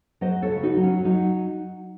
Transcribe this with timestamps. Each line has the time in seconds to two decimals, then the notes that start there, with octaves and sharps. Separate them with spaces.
0.21 F#3 C5 D#5
0.42 A4 C#5
0.49 C#3
0.63 D#4 F#4
0.77 F#3
0.84 C#4
1.05 F#3 D#4